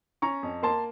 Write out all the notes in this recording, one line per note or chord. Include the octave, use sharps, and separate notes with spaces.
C#4 A#5 C#6
F2
A#3 A5 C6